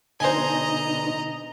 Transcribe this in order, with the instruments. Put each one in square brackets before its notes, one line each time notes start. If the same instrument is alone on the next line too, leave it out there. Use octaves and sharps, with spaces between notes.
[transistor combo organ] B2 D3 D#4 [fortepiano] C5 G#5 [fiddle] D#5 A#5